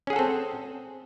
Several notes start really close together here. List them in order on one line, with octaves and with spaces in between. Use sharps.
C#4 G#4 F#5 A4 C4